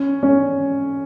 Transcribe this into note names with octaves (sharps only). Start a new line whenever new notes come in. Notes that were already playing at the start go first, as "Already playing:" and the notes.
Already playing: C#4
C#4